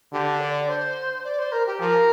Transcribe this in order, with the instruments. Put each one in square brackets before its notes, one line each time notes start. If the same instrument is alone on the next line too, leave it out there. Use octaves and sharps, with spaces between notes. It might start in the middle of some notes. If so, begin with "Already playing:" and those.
[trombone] D3 [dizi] G4
[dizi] D5
C5
D5
C5
A#4
G4
[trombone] F3 [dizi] A#4